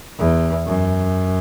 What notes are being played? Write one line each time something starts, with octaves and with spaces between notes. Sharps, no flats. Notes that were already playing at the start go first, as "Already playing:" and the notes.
E2
F#2